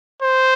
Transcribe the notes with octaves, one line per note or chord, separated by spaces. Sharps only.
C5